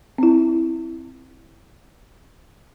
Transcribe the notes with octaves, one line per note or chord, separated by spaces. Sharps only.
C4 E4